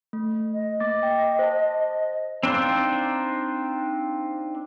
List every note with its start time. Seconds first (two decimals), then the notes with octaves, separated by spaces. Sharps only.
0.13 A3
0.53 D#5
0.80 A#3 D6 A6
1.03 G5
1.39 C5 A5
2.43 C4 D4 D#4 F4